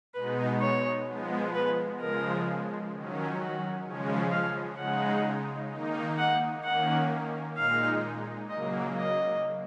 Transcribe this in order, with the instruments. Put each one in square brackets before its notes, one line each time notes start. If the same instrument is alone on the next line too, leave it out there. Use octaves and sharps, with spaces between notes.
[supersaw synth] B2 G#3 B3 D#4 [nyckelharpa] B4
[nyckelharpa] C#5
[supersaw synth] F3 G#3 B3
[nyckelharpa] B4
[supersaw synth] C#3 F3 G#3 [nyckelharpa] A#4
[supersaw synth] D#3 F#3 C#4
[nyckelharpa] F#4
[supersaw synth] C#3 F3 G#3 C#4
[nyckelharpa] F5
[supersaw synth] C#3 G#3 D#4 [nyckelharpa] F#5
[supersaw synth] D#3 A#3 D#4
[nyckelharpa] F#5
[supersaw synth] D#3 A#3 C#4 [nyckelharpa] F#5
[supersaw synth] A#2 G#3 D#4 [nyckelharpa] F5
[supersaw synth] C#3 F#3 A#3 [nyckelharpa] D#5
[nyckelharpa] D#5